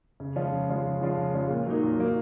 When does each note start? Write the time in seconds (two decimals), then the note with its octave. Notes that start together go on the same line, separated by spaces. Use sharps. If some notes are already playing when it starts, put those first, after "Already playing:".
0.20 C#3
0.36 F3 G#3 C#4 F4
0.52 C#3
0.69 F3 G#3 C#4 F4
0.86 C#3
1.01 F3 G#3 C#4 F4
1.18 C#3
1.34 F3 G#3 C#4 F4
1.50 A#2
1.67 F#3 A#3 D#4
1.83 A#2
1.99 F#3 A#3 D#4